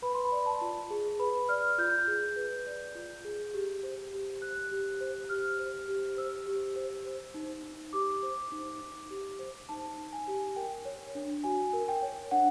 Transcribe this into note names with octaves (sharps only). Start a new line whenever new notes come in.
B4 B5
C6
B5
D5
A5
F4
G#4
B4 B5
D5 F6
F4 G6
G#4
B4
D5
F4
G#4
G4
C5
G4
C5 F#6
G4
C5
G4 F6
C5
G4
C5 E6
G4
C5
C5
D#4
D#4
G4 D6
C5
D#4
D#4
G4
C5
D#4 A5
D#4
G#5
G4
A#4 G5
C#5
D4
F#4 G#5
A#4
G5
C#5
D4 F#5